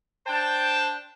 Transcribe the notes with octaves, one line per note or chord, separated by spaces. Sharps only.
D4 C5 G5 A5